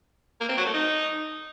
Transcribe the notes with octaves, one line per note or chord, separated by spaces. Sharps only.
A#3
C4
F#3
A3
D#4